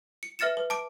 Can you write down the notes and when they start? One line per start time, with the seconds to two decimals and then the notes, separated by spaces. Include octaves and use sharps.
0.23 C#7
0.39 B4 E5 F6 A6 C#7 E7
0.57 B4
0.70 A5 D6 D7